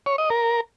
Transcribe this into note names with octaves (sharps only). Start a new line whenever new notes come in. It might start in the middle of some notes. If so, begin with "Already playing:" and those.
C#5
D#5
A#4